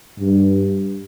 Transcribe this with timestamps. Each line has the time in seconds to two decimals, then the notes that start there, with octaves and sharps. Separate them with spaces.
0.20 G2